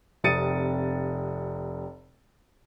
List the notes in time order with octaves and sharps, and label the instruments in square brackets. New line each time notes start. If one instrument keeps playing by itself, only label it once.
[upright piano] F1 C3 D#6 A6 C#7 D#7